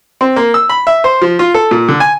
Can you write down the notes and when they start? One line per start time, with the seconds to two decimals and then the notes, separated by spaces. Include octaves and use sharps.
0.21 C4
0.36 A#3
0.54 E6
0.69 B5
0.87 E5
1.04 C5
1.22 F3
1.39 F4
1.54 A4
1.71 A#2
1.88 D3
2.00 G#5